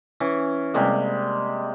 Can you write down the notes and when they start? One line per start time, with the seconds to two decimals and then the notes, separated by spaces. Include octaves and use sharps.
0.20 E3 C#4
0.74 C3 G3 G#3 A#3